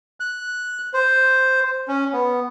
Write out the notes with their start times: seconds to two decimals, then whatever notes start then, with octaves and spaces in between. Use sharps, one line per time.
0.20 F#6
0.94 C5
1.88 C#4
2.12 B3